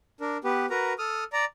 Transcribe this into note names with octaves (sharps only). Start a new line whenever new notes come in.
D4 A#4
B3 G4 B4
F#4 A#4 B4 A#5
A4 D#6 F6
D5 A#5